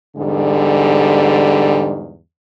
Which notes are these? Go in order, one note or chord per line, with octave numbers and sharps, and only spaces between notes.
E2 G#2 D3 G3